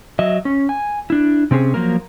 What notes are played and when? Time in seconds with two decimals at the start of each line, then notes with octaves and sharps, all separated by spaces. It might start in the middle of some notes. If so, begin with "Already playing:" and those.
0.19 F#3 D#5 E5
0.45 C#4
0.69 G#5
1.10 D4 E4
1.51 C3 C4 C#4 G#4
1.74 F3 F#3 A#3 A#4